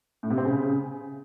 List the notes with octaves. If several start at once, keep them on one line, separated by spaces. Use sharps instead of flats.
A2
C3
C4
C#3